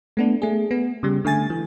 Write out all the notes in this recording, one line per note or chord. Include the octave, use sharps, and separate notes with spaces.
A3 B3 D4
A3 G#4
B3
C#3 G3
D3 A3 G#5 A6
E3